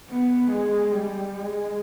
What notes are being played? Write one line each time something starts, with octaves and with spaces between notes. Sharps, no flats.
B3
G#3
G3
G#3